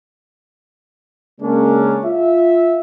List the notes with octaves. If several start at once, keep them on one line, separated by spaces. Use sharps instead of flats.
C#3 G#3 A#3 C#4 D4 A#4
F4 E5